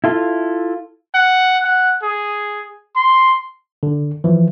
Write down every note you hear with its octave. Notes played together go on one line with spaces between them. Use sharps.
E4 F4 A4
F#5
F#5
G#4
C6
D3
E3 F3